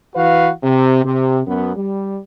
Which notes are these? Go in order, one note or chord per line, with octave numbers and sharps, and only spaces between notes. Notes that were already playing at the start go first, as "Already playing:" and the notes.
E3 F#4 B4 F5
C3
C3
F#2 B3
G3